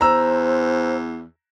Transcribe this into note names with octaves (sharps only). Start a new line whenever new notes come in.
E2 C5 A#5 E6